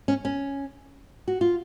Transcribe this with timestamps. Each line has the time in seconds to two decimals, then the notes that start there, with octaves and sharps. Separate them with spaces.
0.08 C#4
0.25 C#4
1.28 F#4
1.41 F4